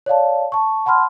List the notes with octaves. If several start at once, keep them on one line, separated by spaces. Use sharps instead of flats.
C#5 D5 F5 A5
A5 C#6
F#5 A5 B5 C6 F6